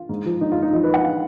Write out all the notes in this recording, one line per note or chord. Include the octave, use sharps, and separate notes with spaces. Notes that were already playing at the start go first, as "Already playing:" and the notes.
Already playing: F4
G#2
F3
G#2 D#4
F4
G#2
D#4
F3 D#4
B4
F3 F#5
F5